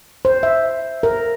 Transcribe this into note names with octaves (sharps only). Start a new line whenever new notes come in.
C5
E5
A#4